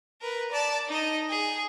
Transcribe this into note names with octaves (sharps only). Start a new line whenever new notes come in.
A#4 B4
D5 A5
D#4 D#5
G#4